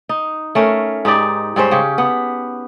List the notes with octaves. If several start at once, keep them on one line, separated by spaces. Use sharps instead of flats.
D#4
A3 C#4 A#4
G#2 D#4 G4 D5
G#2 G3 C#4 C5
C#3 G4
B3